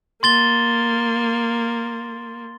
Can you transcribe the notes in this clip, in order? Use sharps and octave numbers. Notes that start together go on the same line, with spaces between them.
A#3 C6 A6 G7